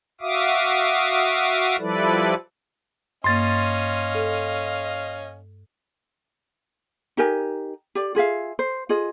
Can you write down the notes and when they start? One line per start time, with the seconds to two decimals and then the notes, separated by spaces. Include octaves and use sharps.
0.21 F#4 E5 F5 D6 D#6
1.79 F3 G3 E4 A4 B4 D5
3.24 G2 A#3 C#4 D#5 F5 C6 A6
4.15 A4
7.17 D#4 G4 A#4 G#5
7.95 G4 D5
8.15 F4 G#4 E5 F5
8.59 C5
8.89 F4 G#4 D#5